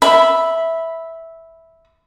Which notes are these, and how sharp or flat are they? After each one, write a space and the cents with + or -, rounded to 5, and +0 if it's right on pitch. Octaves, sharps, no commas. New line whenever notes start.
E5 -5 B5 +0